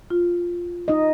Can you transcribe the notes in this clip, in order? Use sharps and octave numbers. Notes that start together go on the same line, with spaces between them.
F4
D#4 D#5